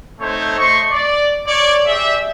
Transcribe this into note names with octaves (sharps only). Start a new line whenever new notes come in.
A3 C4 D#4 A4 C5 C#5
A3 D#5 C6 C#6
D5
C#5 D5 C#6
G4 G#4 D5 E5